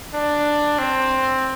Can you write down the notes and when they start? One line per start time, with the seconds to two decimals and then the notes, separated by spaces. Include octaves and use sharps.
0.14 D4
0.79 C4